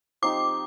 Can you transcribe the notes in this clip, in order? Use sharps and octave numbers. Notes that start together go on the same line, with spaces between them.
F3 C4 D#4 G4 D6